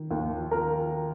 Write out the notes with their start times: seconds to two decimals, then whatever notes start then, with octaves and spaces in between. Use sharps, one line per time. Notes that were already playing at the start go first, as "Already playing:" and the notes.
Already playing: D#3
0.11 D#2
0.51 A#4